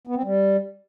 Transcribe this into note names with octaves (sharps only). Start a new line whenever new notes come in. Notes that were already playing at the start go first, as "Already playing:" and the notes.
B3
C4
G3